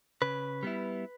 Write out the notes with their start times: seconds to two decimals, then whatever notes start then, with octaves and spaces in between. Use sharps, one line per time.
0.22 C#3 B4
0.63 G3 B3 E4